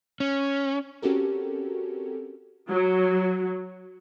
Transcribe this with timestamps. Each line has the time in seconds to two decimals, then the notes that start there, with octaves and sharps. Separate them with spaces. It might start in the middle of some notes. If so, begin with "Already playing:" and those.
0.20 C#4
1.02 C4 C#4 F#4 G4 A4 A#4
2.69 F#3